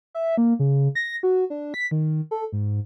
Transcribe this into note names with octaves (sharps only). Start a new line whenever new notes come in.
E5
A#3
C#3
A#6
F#4
D4
B6
D#3
A4
G#2